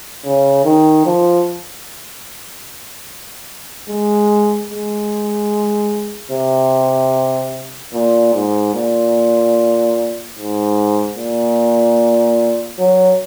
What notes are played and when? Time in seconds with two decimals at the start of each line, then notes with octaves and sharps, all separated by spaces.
0.25 C#3
0.65 D#3
1.06 F3
3.89 G#3
4.70 G#3
6.31 C3
7.93 A#2
8.34 G#2
8.74 A#2
10.37 G#2
11.17 A#2
12.79 F#3